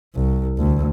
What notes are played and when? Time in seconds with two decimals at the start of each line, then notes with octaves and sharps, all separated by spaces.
0.15 C2
0.58 D2